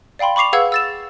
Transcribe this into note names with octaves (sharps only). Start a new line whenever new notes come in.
D5 F5 G5 B5 C6
B5 C#6 D6 C7 F7
G#4 B4 F5 F#5 E6 G#6
E6 A6 E7